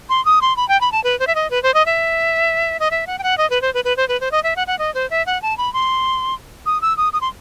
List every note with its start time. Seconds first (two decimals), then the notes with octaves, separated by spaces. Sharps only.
0.09 C6
0.25 D#6
0.42 C6
0.57 B5
0.69 G5
0.81 B5
0.92 A5
1.04 B4
1.20 C5
1.27 E5
1.35 D#5
1.51 B4
1.63 C5
1.74 D#5
1.86 E5
2.80 D#5
2.91 E5
3.07 F#5
3.19 G5
3.23 F#5
3.38 D#5
3.50 B4
3.62 C5
3.74 B4
3.85 B4
3.97 C5
4.08 B4
4.21 C5
4.32 D#5
4.43 E5
4.56 F#5
4.67 F#5
4.79 D#5
4.94 C5
5.10 E5
5.26 F#5
5.42 A5
5.58 B5
5.73 C6
6.66 D#6
6.82 E6
6.97 D#6
7.13 D#6
7.21 C6